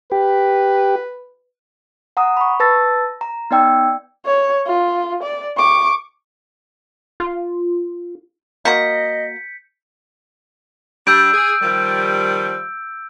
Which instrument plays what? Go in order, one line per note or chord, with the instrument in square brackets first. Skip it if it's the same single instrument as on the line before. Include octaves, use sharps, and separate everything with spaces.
[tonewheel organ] G4 [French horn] B4
[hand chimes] F#5 A#5 D#6
B5 C#6
B4 A5 E6 A6 A#6
A#5
B3 D#4 D5 G5 E6
[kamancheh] C#5
F4
D5
C#6 D6
[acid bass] F4
[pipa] A#3 F#4 A#5 [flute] D#5 [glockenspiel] G6 B6 C#7
[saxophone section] G3 D4 [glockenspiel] E6 G6 D7
[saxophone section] G#4
D#3 F3 G3